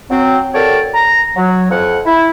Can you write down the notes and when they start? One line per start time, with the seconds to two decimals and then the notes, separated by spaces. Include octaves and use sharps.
0.10 F#3 C4
0.54 F#4 G4 A4 A#4 C#5 D5
0.94 A#5
1.36 F#3
1.70 F2 F#5
2.05 E4